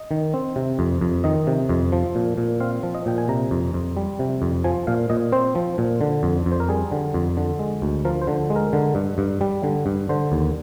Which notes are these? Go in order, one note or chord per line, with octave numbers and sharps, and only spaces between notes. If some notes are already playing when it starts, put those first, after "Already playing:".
Already playing: D#5
D#3
C4
C3
F2
F2
D#3 D#5
C3
F2
F3
A#2
A#2
C4 F5
F3
D#5
A#2 G5
G#5
C3 A#5
F2
F2
G3
C3
F2
F3 G#5
A#2 F5
A#2 D#5
C4 C5
F3
A#2
D3
F2
F2
C5
A#4
G3 G#4
D3
F2
D3
G#3
D2
F3 A#4
C5
D3
G#3
A#4
D3
G2
G2
G3
D3
G2
D3 C5
D#2